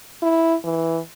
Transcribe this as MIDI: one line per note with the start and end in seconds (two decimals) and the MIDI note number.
0.22 0.55 64
0.64 1.00 52